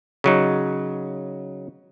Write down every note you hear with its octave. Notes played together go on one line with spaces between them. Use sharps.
C#3 F#3 D#4